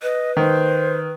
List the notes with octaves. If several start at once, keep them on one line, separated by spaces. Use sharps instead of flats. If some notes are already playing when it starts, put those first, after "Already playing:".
B4 D#5
D#3 C5